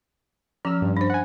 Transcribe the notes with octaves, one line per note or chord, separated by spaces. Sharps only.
F3 C#4 E6 F6
G2
D4 C5
F#5 G#5